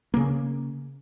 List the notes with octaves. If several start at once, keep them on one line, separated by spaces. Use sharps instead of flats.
C#3 A#3